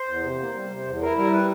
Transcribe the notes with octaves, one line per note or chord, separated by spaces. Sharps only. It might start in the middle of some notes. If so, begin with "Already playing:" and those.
Already playing: C5
E2
C3
A#3
G3
C3
E2
E4 A#4
G3 A#4
B4